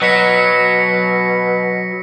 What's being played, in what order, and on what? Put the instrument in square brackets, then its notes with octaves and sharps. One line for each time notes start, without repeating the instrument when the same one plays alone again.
[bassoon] B2 [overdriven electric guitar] F#3 [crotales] A#6 B6 C#7